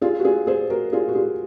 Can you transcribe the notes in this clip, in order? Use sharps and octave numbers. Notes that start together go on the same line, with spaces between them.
F4 G#4
F#4
F4 G#4
G#4 C5
F#4 A#4
F4 G#4
F#4
F4 G#4